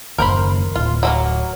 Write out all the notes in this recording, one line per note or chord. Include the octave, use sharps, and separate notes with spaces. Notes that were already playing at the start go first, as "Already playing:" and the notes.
F#1 D#2 A#4 C5 B5
D1 F4
F#3 A3 A#3